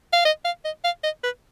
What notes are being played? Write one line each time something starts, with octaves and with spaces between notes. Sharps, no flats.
F5
D#5
F5
D#5
F5
D#5
B4